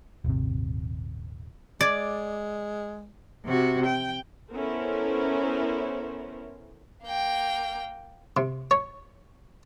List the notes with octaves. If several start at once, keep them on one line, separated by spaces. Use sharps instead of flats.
D#1 G#1 C3
G#3 D5 D6 G#6 A6
C3 F#4
G5
B3 C#4 E4 A4 A#4 C5
A#3 G5
C3
C#5